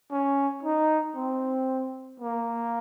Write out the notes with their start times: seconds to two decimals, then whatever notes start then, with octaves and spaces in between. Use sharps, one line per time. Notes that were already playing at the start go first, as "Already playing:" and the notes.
0.11 C#4
0.63 D#4
1.16 C4
2.20 A#3